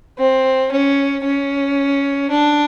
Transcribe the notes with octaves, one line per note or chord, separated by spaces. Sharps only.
C4
C#4
C#4
D4